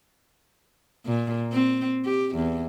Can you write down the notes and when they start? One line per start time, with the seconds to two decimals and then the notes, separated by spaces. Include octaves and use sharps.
1.06 A#2
1.52 C4
2.05 G4
2.36 E2